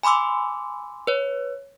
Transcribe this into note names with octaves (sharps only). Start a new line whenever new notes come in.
G#5 B5 C6 D6 E6
B4 C#5